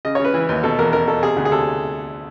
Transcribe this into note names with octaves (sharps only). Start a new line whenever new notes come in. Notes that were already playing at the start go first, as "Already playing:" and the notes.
C#3 D#5
C#5
C#3
B4
E3
D#2
B2 A4
E2 A#4
B2 A#4
B2 A4
C3 G#4
D2
G#4
C3 A4